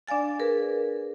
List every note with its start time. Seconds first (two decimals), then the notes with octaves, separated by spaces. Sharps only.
0.07 D4 D5 F5 G#5 A6
0.39 G#4 A#4 B4